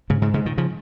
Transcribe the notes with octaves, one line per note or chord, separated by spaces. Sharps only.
G#2 C#3
G#2 C#3
G#2 C#3
A#2 D#3
C#3 F3